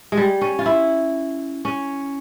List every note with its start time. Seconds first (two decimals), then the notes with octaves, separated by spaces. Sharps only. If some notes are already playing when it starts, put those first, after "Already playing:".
0.12 G#3
0.17 G3
0.41 C#4
0.59 F4
0.66 E4
1.65 C#4